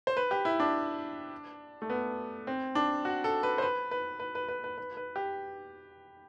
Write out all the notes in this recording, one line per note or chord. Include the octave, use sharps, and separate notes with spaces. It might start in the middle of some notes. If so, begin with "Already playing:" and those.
C5
B4
G4
E4
D4
A3
B3
C4
D4
F#4
A4
B4
C5
B4
B4
B4
B4
B4
B4
B4
B4
G4